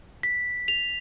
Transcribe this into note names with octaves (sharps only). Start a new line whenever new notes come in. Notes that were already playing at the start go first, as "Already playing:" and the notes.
B6
F7